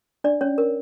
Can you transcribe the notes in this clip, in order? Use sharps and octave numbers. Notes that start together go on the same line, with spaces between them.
D4 D5
C#4 C#5
A#4